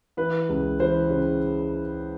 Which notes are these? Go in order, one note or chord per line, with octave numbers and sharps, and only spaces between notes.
E3 B4
C#2
E3 C5
C#3